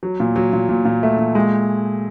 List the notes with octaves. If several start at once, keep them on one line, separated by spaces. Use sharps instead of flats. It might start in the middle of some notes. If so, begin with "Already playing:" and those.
F#3
A#2
F#3
A#2
A#2
A#2
A3
A#2
G#3